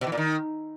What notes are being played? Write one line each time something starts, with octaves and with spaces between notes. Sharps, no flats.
B2
E3
A#2
D#3